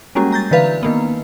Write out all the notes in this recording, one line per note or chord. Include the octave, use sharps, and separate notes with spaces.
G3 G#3 A#3 C#4 F#4
A#5 G6 A6
D3 E3 B4 F5
D#3 A#3 B3